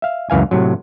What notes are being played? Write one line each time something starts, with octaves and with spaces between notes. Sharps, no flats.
E5 F5
C#2 F#2 E3 F5 G#5
A2 C3 F#3